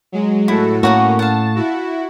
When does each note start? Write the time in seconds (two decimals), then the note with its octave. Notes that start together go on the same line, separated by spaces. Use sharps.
0.12 F#3 G#3
0.48 A2 E4 F#4 A4
0.83 A2 A#3 C#4 F#4 F#5 A#5
1.19 F5 F#5 A5
1.56 E4 F#4